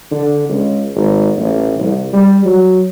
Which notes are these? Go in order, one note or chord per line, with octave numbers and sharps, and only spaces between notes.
D3
C#2
G#1
A1
C2
G3
F#3